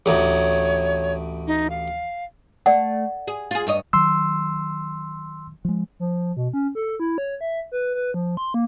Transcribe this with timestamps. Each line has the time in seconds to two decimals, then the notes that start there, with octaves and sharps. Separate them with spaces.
0.06 A1 D2 C#5
1.47 D#4
1.70 F5
2.66 A3 D5 F#5
3.27 G#4
3.51 F4 G#4
3.67 G2 C#5 D#5
3.93 D#3 F#3 C6 E6
5.65 F3 G#3
6.00 F3
6.37 B2
6.54 C#4
6.75 A4
7.00 E4
7.18 C#5
7.41 E5
7.72 B4
7.95 B4
8.14 F3
8.37 C6
8.54 A#3